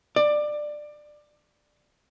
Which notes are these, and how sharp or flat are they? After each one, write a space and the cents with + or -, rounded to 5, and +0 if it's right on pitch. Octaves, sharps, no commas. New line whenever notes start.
D5 +20